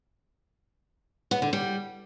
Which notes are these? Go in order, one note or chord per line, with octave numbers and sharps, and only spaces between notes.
B3
D3
G3